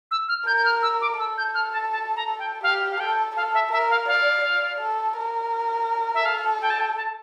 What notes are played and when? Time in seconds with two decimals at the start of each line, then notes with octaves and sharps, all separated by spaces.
0.11 E6
0.28 F6
0.47 A#4 G6
0.57 G6
0.65 F6
0.82 E6
1.01 D6
1.19 A4 E6
1.38 G6
1.55 F6
1.73 A5
1.92 A5
2.16 A#5
2.39 G5
2.63 G4 F5
2.91 F5
3.00 A4 G5
3.36 A4 F5
3.54 E5
3.72 A#4 E5
3.90 F5
4.08 D5 F5
4.44 D5
4.81 A4
5.17 A#4
6.14 E5
6.25 A4 F5
6.61 G5
6.70 A5
6.80 G5
6.97 A5